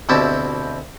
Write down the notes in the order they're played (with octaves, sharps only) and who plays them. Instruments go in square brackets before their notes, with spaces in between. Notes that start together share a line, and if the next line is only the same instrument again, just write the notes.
[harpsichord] D2 B2 C4 E4 G4 A5